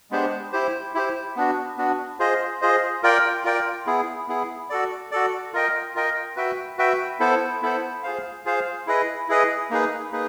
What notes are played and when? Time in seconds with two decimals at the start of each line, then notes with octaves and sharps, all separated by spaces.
0.11 G#3 B3 D4 G4 C5
0.53 E4 G4 C5
0.94 E4 G4 C5
1.36 B3 D4 F#4
1.77 B3 D4 F#4
2.19 F4 G#4 C5 D#5
2.61 F4 G#4 C5 D#5
3.03 F4 A#4 D5 G5
3.44 F4 A#4 D5 G5
3.86 B3 E4 G#4
4.28 B3 E4 G#4
4.70 F#4 A4 D5
5.11 F#4 A4 D5
5.53 F4 A#4 D#5 G5
5.95 F4 A#4 D#5 G5
6.36 F#4 B4 E5 G5
6.78 F#4 B4 E5 G5
7.20 B3 E4 A4 C5
7.62 B3 E4 A4 C5
8.03 F4 G#4 C5 F5
8.45 F4 G#4 C5 F5
8.87 E4 G#4 B4 D#5
9.28 E4 G#4 B4 D#5
9.70 A#3 D#4 G#4 B4
10.12 A#3 D#4 G#4 B4